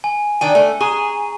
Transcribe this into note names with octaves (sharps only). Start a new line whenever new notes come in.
G#5
D#3 D4 G5 D#7
A3
G#4 A#5 C#6 D#7